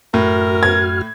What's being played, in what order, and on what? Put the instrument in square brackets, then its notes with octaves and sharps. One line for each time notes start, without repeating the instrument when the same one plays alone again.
[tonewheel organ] F#2 F#4 F6 [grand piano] A2 [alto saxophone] A#4
[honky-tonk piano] G#6